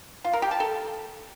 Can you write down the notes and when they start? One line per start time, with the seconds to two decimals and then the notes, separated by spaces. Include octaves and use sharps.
0.24 F4
0.33 A#4
0.42 G4
0.51 A5
0.60 A4